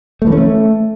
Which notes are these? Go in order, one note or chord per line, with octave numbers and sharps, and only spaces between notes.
A3
E3
C#4
A3